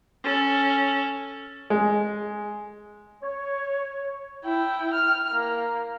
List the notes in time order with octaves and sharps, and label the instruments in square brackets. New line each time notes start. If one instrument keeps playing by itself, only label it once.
[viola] C#4 A4
[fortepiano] G#3
[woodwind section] C#5
[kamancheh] E4 G5
F6
A#3